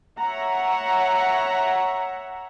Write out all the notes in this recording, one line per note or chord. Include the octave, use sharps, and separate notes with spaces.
C#5 E5 F#5 A#5